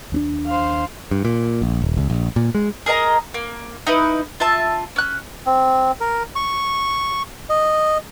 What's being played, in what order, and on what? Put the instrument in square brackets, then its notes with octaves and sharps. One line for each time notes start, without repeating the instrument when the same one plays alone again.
[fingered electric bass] D#2 C4 D4
[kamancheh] C5 F5
[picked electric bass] G2
A#2
A#1
D#1
C#2
A#1
A#2
G#3
[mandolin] G#4 A#4 D#5 A#5
A#3
D#4 E4 B4
F4 E5 A5
C#4 F#6
[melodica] C4
A#4
C#6
D#5